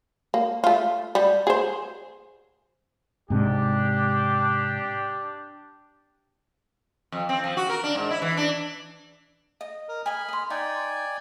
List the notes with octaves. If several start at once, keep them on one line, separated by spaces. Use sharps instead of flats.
A#3
A3 F4
G3
G#4 C5
G#2 C3 D4 G4
F2
C4
F3
F#4
A#4
D4
G#2
E4
E3
D4
D#5
A#4
D#5 G#5 B5 F6
D#5 C6
D#4 D5 G5 G#5